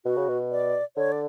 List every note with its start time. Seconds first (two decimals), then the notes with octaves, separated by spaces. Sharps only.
0.05 B2 F#4
0.16 C#3
0.28 B2
0.51 D5
0.96 D3 C#5
1.12 D5